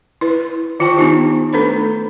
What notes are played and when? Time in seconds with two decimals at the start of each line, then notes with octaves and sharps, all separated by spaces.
0.21 E4 B4
0.80 D#3 F4 C5 G5 A5 C#6
0.96 B3 D4 D#4 F4 G4
1.53 A3 D4 A4 B4 C5 B5